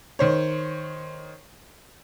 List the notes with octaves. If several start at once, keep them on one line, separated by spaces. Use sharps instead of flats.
D#3 C5 C#5